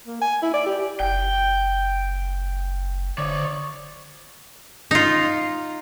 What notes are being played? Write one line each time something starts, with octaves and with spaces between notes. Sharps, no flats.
A#3
G#5
E4
D5
G4
F#1 G5
D3 C#5 D5
D#4 F4